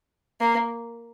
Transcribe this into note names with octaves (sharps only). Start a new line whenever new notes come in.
A#3